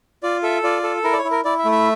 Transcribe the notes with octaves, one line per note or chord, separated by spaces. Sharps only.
F4 D5
A4 E5
F4 D5
A4
E4 A#4
D5
C#5
E4
A#4
E4 D5
E5
A3
E5